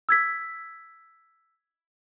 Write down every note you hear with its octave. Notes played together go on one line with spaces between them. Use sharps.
E6 G#6 B6